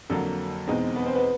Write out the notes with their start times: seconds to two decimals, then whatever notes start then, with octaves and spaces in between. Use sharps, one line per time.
0.10 F2 D3 F#3 A#3 A4
0.67 E2 B2 G#3 C4 D#4
0.96 B3 B4
1.06 C4 C5
1.15 B3 B4